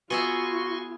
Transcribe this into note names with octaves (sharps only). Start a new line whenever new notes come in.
B3 F4 F#4 G#4 E5 G#5 C6 C#6